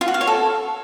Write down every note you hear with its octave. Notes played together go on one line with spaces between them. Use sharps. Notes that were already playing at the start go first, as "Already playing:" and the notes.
F4
F#4
F5
C#5
A4